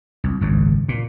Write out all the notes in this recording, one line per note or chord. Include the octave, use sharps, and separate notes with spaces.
C2
G#1 C#2 F#2
A#2